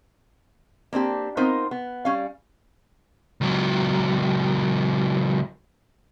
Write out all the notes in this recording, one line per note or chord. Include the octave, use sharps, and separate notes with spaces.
A#3 C4 D4 G4
B3 C4 D#4 F4 A#4 C5
B3
G3 C#4 F5
C#2 F#3